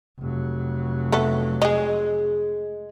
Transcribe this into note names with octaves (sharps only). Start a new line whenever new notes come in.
F1 F#3
A3 B3 A4
G#3 G#4 D#5